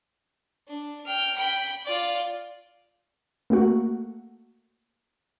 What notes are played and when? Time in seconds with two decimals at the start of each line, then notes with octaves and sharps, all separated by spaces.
0.68 D4
1.06 G5 F6
1.36 G5 B5
1.85 F4 D5
3.50 A3 A#3 F#4